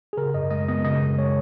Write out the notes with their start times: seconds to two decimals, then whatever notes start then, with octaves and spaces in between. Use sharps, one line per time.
0.13 G#4
0.17 C#3 A#4
0.34 F#2 D#5
0.50 G#3 D#5
0.68 B3 D#5
0.85 C#3 D#5
1.01 F#2
1.18 G#3 C#5